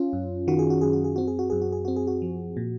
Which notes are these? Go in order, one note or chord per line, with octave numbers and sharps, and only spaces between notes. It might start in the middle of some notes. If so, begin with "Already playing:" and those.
Already playing: C#4 F4
F#2
D#3 F#4
G#4
F#4
F#2 G#4
F#4
G#4
C4 F#4
G#4
F#4
F#2 G#4
F#4
G#4
C4 F#4
G#4
F#4
F3
A#2